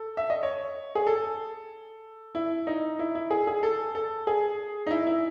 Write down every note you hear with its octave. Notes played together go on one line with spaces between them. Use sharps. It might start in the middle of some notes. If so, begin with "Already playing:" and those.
Already playing: A4
E5
D#5
C#5
G#4
A4
E4
D#4
E4
E4
G#4
G#4
A4
A4
G#4
D#4
E4
E4